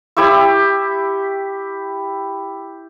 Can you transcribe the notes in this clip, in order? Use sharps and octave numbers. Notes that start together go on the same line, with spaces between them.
E4 G4 C#6 E6